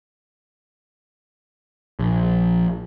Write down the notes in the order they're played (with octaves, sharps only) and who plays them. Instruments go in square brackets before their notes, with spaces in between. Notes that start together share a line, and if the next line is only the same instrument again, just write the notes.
[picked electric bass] A#1